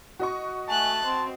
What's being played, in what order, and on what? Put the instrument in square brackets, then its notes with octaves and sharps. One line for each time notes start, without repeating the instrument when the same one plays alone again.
[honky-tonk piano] F#4 D#5 C#6
[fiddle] A3 F#6 [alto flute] G#5 [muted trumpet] A5
[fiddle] C4 [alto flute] C6